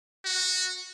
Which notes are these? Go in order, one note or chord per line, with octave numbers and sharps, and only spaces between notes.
F#4